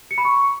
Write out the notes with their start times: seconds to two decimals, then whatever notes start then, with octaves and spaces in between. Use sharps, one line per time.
0.11 C#7
0.18 B5
0.25 C#6